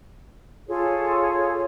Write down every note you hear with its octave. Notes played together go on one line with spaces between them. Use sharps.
F4 G#4 A4 C#5